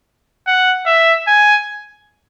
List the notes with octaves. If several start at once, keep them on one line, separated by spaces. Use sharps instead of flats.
F#5
E5
G#5